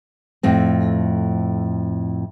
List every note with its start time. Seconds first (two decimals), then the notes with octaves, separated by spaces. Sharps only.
0.43 F2 A2 C4